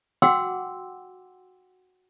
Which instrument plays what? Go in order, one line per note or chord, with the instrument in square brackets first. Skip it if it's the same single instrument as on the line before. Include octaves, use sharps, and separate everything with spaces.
[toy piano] F#4 F#5 G5 C6 D6 E6